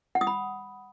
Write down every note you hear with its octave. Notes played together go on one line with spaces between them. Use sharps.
F#5
D#6
B5